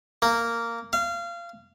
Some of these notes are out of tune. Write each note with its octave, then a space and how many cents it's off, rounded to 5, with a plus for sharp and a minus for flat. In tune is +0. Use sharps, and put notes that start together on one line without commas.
A#3 -10
F5 -25